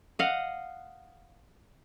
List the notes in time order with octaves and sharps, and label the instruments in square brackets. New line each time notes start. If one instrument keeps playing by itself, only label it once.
[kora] D#5 F5 F#5